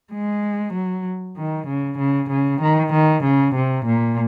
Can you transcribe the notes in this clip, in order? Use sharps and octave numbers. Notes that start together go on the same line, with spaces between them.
G#3
F#3
D#3
C#3
C#3
C#3
D#3
D#3
C#3
C3
A#2